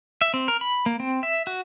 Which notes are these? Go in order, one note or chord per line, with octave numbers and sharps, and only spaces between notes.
E5
C4
A#4
B5
A#3
C4
E5
F#4